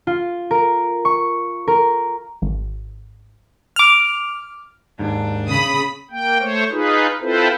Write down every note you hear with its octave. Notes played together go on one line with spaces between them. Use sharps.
F4
A#4
C#6
A#4
G#1
D6 F6
D#2 G#2 D4
C#3 B5 D#6
A#3 G5
A3 C5 C#5
D#4 F4 G#4 B4
C4 E4 F4 A4 B4 C5